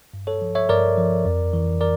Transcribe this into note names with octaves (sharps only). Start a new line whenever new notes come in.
G2
A4 C#5
F3
C#5 E5
G2 A#4 D5
F3
F2
E3
A#4 D5